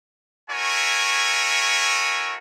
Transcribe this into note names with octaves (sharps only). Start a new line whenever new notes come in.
A3 E4 F#4 A#4 C#5 G#5